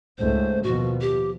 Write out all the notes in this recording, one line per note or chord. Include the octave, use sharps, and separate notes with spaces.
C#2 G#2 A3 C5
D#2 B2 F3 F#4
G4